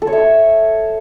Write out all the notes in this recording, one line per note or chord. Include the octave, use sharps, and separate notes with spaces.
A4
C#5
E5